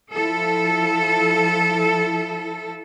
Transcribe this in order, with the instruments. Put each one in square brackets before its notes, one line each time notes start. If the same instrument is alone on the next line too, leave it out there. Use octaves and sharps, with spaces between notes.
[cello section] F3 E4 A4